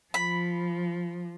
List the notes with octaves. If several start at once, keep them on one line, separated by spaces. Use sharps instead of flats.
F3 B5